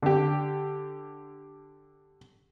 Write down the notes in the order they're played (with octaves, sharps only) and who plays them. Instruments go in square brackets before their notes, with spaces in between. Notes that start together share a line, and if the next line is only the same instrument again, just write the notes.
[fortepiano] D3 G4